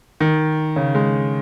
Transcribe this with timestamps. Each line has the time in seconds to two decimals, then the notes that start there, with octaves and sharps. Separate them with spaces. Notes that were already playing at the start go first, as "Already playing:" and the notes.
0.20 D#3
0.76 C#3
0.95 G#3